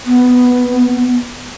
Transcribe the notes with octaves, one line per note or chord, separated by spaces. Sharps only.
B3